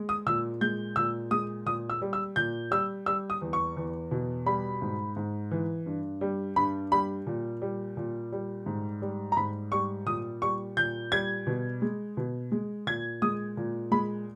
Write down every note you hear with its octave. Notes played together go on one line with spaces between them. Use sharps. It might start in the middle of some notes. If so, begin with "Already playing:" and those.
Already playing: G#3
D#6
A#2 E6
G#3 G6
A#2 E6
G#3 D#6
A#2 D#6
E6
G3
E6
A#2 G6
G3 E6
G3 E6
D#6
E2
C#6
E2
B2
G3 B5
G#2
G#2
E3
G2
G3
G2 B5
G3 B5
A#2
G3
A#2
G3
G#2
G3
A#5
G#2 B5
G3 C#6
A#2 D#6
G3 C#6
A#2 G6
G3 G#6
B2
G#3
B2
G#3
A#2 G#6
G#3 D#6
A#2
G#3 B5